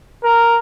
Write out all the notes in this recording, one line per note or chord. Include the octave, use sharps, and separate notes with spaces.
A#4